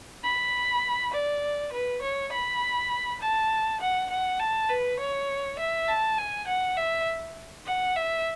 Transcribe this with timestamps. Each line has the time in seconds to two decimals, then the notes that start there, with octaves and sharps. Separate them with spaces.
0.24 B5
1.13 D5
1.73 B4
2.02 C#5
2.32 B5
3.21 A5
3.80 F#5
4.10 F#5
4.39 A5
4.69 B4
4.99 C#5
5.59 E5
5.88 A5
6.18 G#5
6.47 F#5
6.77 E5
7.66 F#5
7.96 E5